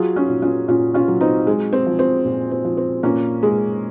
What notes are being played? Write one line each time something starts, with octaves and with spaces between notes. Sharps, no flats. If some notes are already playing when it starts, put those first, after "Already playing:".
Already playing: F#3 F4 G#4
C#4 F4
A#2
C#4 F4
A#2 C#4 F4
C#4 F4
F#3
C4 D#4
G#3
C4
F3
C4
A#2
C4
F3
C4
A#2 A#3 C#4
G#3